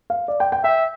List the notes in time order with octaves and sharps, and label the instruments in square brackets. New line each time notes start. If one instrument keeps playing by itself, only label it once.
[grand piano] F5
D5
G5
G5
[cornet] E5 [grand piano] G5